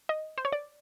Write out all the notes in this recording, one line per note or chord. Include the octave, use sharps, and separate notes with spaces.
D#5
C5
C#5
D5